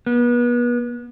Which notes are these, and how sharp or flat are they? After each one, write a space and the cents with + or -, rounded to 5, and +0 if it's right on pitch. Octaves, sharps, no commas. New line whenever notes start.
B3 -35